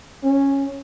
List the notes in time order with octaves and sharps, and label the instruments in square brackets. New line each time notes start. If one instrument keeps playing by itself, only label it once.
[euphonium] C#4